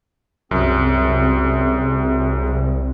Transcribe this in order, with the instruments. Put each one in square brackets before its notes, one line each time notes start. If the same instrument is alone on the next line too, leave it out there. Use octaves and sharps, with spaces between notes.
[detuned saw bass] C2 [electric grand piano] F#2 [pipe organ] C4 G#4